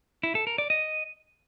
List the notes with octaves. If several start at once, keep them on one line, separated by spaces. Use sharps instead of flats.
E4
A4
A#4
D5
D#5